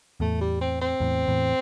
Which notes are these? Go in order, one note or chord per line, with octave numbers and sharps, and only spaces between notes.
E2 A2 A3
G3
C4
C4
E2 A2
E2 A2